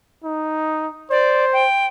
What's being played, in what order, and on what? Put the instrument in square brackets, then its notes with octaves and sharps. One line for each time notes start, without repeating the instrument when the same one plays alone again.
[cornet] D#4
[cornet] C5 [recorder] D5
[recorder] G5